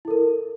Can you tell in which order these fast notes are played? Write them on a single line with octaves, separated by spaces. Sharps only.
E4 A4 A#4